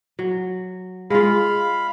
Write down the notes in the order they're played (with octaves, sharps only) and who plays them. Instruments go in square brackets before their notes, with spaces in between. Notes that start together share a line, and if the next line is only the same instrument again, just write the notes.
[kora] F#3
[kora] G#3 F4 [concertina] F5 B5